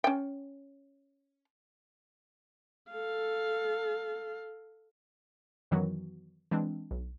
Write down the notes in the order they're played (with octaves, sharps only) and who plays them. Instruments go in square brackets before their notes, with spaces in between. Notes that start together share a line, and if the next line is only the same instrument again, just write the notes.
[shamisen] C#4 G5
[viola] A4 F5
[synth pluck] F#2 D#3 E3 F#3 B3 F#4
E3 G#3 C4 D4
B1